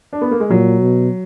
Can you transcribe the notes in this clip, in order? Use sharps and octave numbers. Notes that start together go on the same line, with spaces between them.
D4
B3
A#3
G#3
A#2 F#3
B2